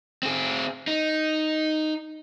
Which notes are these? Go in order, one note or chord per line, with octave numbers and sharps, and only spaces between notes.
C4 G#4
D#4